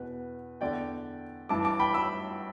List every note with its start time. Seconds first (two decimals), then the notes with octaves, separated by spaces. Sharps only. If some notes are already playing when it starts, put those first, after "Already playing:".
Already playing: E2 B2 B4
0.61 E2 D3 D5 G5
1.49 G2 E3 A5 D6
1.65 A5 D6
1.80 G5 B5
1.94 B5 E6